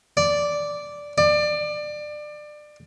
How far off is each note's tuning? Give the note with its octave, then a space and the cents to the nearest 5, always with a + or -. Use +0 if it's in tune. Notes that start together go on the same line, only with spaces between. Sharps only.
D5 -5
D5 +25